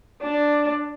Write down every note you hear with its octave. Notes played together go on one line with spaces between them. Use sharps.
D4